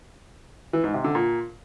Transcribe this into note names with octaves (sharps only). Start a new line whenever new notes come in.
E3
G#2
C3
D3
A#2